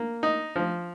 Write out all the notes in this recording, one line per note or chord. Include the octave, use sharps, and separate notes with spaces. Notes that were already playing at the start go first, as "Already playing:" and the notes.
Already playing: A#3
D#4
F3